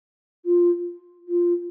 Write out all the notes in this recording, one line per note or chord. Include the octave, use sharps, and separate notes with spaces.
F4
F4